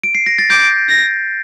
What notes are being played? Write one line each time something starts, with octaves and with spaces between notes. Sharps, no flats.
D7
C7
A#6
A6
D6 G6
A#6